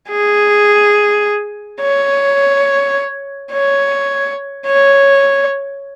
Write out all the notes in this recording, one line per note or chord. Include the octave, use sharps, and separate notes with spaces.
G#4
C#5
C#5
C#5